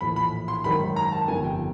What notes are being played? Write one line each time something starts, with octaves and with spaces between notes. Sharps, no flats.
A#1 A2 E3 B5
B5
C6
G#1 F#2 D#3 B5
A#5
A5
G1 F2 C3 D#3 G#5
G5